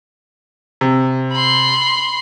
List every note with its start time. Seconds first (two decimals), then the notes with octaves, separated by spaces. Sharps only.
0.81 C3
1.32 B5 C6